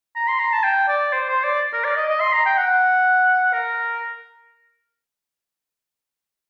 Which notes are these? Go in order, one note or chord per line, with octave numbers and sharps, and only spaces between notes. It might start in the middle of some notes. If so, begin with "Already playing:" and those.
A#5
C6
A#5
A5
G5
D5
C5
C5
D5
A#4
D5
D#5
D#5
C6
A#5
G5
F#5
A#4